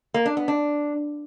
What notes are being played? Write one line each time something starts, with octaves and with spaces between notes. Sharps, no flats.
A#3
D4
B3
D4